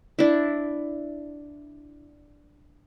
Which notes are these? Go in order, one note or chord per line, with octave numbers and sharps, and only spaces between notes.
D4 E4